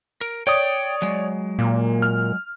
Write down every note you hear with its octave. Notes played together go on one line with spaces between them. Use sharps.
A#4
C#5 D5 G5 D#6
F#3 G#3
A#2 A#3
F6